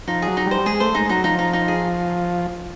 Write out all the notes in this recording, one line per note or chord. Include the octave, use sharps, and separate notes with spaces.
F3 D#4
G#4
F#3
D#4
G3
C5
G#3 G#4
A3 C5
G#3 D#4
F#3 D#4
F3 D#4
D#4
D#4
G#4